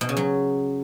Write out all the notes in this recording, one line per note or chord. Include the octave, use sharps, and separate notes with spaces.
B2
C#3
F#3